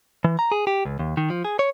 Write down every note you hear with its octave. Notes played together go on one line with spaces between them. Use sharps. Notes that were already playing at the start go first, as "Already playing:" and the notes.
E3
A#5
G#4
G4
C#2
D#2
D#3
F3
G#4
C#5